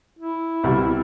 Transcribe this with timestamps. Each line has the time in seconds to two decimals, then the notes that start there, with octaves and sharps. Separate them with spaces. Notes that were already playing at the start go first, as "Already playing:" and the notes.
0.19 E4
0.64 C2 B2 G3